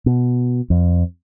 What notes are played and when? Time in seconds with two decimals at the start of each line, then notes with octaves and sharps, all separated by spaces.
0.06 B2
0.70 F2